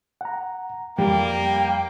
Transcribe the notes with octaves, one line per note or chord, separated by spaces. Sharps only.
F#5 A#5
F2 G3 A#3 G5